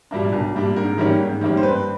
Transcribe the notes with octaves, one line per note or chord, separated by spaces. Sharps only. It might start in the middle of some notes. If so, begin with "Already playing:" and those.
A#2 G3 A#3 D4
B1
A#2 G3 A#3 D4
G#2 A#4
D#3 G3 A#3 C#4
G#2
D#3 G3 A#3 C#4
C5
G2 B4